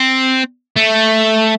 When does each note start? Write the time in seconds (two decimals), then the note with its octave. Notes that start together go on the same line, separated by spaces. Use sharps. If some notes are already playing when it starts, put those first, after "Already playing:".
Already playing: C4
0.76 A3